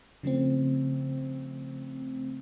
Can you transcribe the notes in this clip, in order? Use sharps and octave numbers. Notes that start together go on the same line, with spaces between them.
C#3 F3 A3 C4